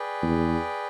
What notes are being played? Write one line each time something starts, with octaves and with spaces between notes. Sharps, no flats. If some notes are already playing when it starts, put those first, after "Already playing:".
Already playing: G#4 B4 D5 G5
E2